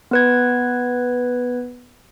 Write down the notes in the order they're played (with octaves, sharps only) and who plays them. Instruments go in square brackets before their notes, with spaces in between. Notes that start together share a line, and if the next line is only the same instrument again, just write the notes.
[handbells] B3 B4 G#6